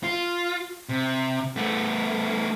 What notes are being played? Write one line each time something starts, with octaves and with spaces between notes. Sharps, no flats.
F4
C3
A3 B3